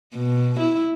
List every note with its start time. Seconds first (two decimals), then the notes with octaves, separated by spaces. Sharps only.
0.15 B2
0.59 E4